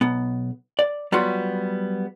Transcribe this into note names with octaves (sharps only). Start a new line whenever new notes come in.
B1 B3
D5
F#3 G3 B3 F4 F#4